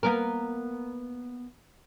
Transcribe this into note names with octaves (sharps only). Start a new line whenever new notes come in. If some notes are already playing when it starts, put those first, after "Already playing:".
A#3 B3 A#4